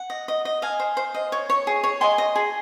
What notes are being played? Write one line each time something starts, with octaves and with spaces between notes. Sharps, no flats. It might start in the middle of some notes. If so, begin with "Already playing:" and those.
Already playing: F#5
D#5
D#5
D#5
D#5 F5 G#5
C5
C5
D#5
C#5
C#5
G#4
C#5
D#5 G#5 C6
D#5
G#4